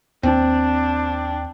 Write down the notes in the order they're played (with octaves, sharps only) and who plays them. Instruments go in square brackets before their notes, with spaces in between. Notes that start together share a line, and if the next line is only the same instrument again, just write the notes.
[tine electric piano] D#2 [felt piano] C4 [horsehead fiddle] D4